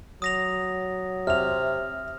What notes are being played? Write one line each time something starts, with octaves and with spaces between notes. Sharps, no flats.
F#3 D#6 A#6 F7
C3 E5 F6 F7